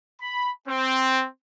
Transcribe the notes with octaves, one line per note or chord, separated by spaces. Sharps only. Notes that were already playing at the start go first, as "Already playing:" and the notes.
B5
C4